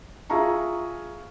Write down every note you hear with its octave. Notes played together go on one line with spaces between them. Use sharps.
F4 G#4 E5 F5 A#5 C#6